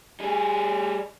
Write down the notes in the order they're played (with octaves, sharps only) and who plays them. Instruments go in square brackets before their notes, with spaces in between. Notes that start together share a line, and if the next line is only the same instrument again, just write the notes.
[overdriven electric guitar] G3 G#4